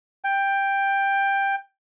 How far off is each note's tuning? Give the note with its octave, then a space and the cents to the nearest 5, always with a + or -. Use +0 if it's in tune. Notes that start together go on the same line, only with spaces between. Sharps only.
G5 +10